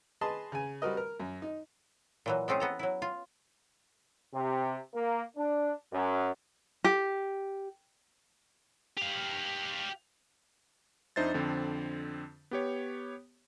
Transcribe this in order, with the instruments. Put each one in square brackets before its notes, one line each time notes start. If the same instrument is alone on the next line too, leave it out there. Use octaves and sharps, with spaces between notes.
[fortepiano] G#4 B4 D#5 A5 C6
C#3 G#5
G3 C4 F#4 A#4 D#5
A#4
F#2
D#4
[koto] A#2 E3 F#3
G#3 A3 C4 C#4 G#4
B3 A4 A#5
F#3 E4
F4
[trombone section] C3
A#3
D4
F#2
[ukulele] G4
[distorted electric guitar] G4 F5
[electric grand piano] F2 D4 D#4 C5 E5 A6
F2 D3 C4
B3 G4 C#5